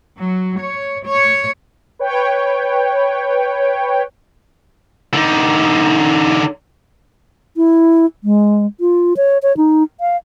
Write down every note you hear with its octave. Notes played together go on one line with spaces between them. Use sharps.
F#3
C#5
C#5
B4 C#5 G5
D3 D#4
E4
G#3
F4
C#5
C#5
D#4
F5